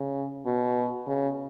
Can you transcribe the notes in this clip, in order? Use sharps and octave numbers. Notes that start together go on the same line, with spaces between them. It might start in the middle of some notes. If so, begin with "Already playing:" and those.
Already playing: C#3
B2
C#3